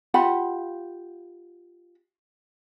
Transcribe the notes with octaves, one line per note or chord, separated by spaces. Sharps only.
F4 G4 F#5 B5